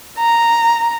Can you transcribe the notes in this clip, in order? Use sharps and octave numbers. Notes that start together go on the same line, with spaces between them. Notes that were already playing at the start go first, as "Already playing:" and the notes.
A#5